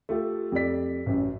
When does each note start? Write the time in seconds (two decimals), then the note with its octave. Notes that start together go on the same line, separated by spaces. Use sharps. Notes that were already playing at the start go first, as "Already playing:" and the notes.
0.09 A3 F4 G4 A4
0.52 F2 G4 A4 D5 B6
1.06 A1 F#2